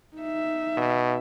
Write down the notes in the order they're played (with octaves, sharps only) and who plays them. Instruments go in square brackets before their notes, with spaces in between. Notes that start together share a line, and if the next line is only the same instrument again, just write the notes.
[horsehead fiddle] D#4 E5
[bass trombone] B2